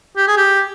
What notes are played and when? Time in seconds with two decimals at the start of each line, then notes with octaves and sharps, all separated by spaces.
0.17 G4
0.27 G#4
0.37 G4